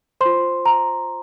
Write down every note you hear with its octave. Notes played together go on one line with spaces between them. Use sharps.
F4 C5 C6
A#5